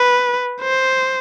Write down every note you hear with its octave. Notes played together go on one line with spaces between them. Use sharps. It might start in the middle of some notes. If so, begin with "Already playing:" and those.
Already playing: B4
C5